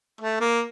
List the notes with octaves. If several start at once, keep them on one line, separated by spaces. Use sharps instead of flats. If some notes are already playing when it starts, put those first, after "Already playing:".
A3
A#3